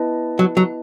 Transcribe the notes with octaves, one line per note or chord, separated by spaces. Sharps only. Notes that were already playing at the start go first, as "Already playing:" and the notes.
Already playing: B3 E4 B4 D#5 A5
F#3
F#3